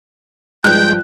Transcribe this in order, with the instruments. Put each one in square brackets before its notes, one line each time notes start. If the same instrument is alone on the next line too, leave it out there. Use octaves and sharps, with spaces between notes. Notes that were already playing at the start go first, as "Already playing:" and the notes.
[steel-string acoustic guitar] G2 F3 [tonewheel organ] G#3 [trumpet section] G5 [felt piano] F#6